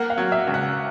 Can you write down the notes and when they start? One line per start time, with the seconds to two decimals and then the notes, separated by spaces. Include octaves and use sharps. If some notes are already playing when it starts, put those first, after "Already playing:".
Already playing: A#3 F#5
0.10 F5
0.18 F#3
0.32 E5
0.47 C#2
0.54 F#5